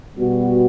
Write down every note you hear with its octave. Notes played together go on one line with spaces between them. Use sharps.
B2 G3 B3 F#4